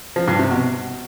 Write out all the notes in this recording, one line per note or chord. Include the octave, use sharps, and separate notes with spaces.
F3
G2
C3
B2